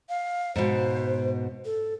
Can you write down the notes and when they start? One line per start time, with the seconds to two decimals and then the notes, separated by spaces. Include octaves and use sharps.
0.09 F5
0.56 G#2 B2 C5
1.65 A4